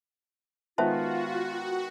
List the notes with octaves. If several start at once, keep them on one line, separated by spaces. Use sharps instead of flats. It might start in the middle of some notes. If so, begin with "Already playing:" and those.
D#3 G#3 B3 F4 F#4 C5 E5 A5